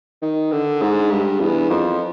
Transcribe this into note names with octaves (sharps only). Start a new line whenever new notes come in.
D#3
D3
G#2
G2
E2
F2